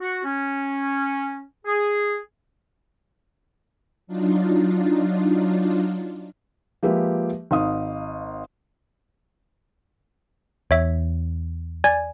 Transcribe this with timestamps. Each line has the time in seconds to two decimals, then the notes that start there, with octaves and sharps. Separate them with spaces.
0.01 F#4
0.24 C#4
1.66 G#4
4.07 F#3 D4 D#4 F4
6.83 F3 G#3 A#3 G4 B4 E5
7.51 G#1 D#4 F5 D#6
10.71 E2 C#5 E5
11.84 D5 G#5 G#6